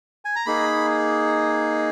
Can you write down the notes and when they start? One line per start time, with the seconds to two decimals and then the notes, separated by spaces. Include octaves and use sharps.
0.25 G#5
0.36 A#5
0.46 A#3 D#4 G#4 B5